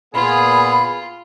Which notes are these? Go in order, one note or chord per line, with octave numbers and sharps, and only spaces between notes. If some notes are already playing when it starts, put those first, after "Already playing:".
A#2 B3 F4 G#4 B5